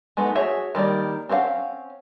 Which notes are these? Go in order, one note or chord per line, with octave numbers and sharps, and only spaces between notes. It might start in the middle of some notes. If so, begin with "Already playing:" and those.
G#3 A3 B3 D#4
F#4 G#4 C#5 E5
D#3 G3 A#3 D5
C4 C#4 A#4 F5 F#5